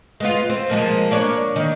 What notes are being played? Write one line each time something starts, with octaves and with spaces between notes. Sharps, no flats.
G#3 B3 F4
C4
F3 G#3 A#3
A#3 D4 C#5
D#3